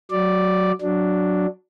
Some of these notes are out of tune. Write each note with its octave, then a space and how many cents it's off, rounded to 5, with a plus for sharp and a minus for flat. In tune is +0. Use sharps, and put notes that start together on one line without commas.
F#3 +0 D5 +0
F#3 -5 D4 +0